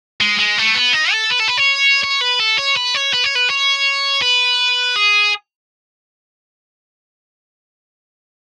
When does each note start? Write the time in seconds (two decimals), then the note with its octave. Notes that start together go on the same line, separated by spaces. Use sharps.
0.21 G#3
0.39 G#3
0.58 A3
0.75 B3
0.94 D#4
1.12 A4
1.31 B4
1.40 A4
1.48 B4
1.58 C#5
2.04 C#5
2.21 B4
2.40 A4
2.59 C#5
2.77 B4
2.95 C#5
3.13 B4
3.24 C#5
3.35 B4
3.50 C#5
4.22 B4
4.96 G#4